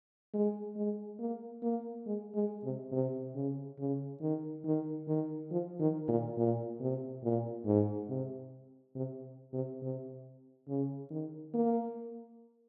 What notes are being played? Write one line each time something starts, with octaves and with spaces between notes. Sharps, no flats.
G#3
G#3
A#3
A#3
G#3
G#3
C3
C3
C#3
C#3
D#3
D#3
D#3
F3
D#3
A#2
A#2
C3
A#2
G#2
C3
C3
C3
C3
C#3
D#3
A#3